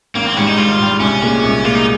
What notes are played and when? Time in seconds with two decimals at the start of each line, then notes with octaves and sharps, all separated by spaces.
0.15 G#1 A#3
0.25 C4
0.36 G#2 G3 C#4
0.47 D#4
0.58 G#1 F4
0.79 G#2 G3
1.00 C2 C#4
1.22 A#2 G#3
1.43 C2
1.64 A#2 G#3 F4
1.75 D#4